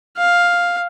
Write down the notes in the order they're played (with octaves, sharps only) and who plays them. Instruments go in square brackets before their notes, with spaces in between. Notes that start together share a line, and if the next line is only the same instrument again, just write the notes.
[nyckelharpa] F5